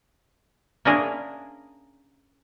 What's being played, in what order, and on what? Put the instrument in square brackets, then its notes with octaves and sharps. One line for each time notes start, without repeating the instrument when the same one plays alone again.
[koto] A#3 C#4 D4 E4 G#4 A#4